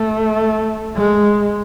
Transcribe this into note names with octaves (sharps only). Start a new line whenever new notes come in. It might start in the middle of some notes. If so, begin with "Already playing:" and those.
Already playing: A3
G#3